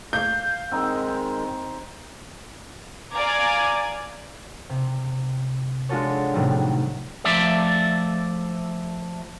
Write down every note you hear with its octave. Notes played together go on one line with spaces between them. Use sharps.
F5 G6
D#3 G#3 C4 D#4
D5 F5 G#5 A#5 D6 G#6
C3
G#3 D4 F4 F#4 A4 C#5
A2 C3 D#3 F#3 G3
F3 A3 D5 E5